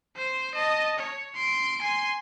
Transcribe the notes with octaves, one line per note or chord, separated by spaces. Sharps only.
C5
D#5 A5
C#5
C6 D7
G#5 C6